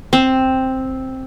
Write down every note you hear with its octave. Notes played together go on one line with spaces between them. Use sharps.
C4